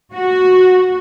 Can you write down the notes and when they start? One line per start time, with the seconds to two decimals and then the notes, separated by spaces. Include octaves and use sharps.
0.13 F#4